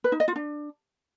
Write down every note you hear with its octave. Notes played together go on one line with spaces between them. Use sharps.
B4
D#4
D#5
F4
D4